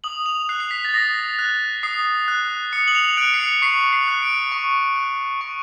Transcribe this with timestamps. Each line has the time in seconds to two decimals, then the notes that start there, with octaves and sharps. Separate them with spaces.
0.04 D#6 F#7
0.26 F7
0.49 F#6 C7
0.60 C7
0.71 B6
0.85 A6
0.94 D#6 A#6
1.39 F#6
1.83 D#6 C7
2.28 F#6
2.73 D#6 C#7
2.88 F#7
2.95 F7
3.17 F#6 D7
3.34 C7
3.40 C#7
3.62 C#6 C7
3.93 C7
4.08 F#6
4.22 D7
4.52 C#6
4.96 F#6
5.41 C#6